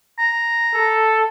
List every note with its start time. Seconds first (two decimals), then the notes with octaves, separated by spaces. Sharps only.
0.19 A#5
0.74 A4